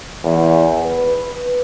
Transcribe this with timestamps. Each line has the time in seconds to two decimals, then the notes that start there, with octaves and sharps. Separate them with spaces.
0.24 E2
0.83 B4